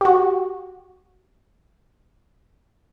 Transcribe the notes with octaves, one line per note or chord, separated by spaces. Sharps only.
F#4 G4